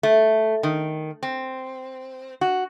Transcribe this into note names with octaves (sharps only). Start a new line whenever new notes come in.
A3
D#3
C4
F#4